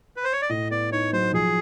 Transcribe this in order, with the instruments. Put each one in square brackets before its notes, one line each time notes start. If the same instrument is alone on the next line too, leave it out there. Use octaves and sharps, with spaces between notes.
[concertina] B4
C5
C#5
D5
[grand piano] A2 [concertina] D#5
[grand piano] B3 [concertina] D5
[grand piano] D#4 [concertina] C#5
[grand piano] F#3 [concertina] C5
[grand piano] F3 [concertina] G#4